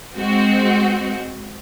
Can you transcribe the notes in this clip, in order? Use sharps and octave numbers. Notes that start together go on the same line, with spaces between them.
G#3 C4 F#4